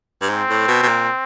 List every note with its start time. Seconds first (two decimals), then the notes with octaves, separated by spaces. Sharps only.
0.22 G2
0.29 G#2 C4
0.49 A2
0.68 B2
0.83 B2
0.88 A#2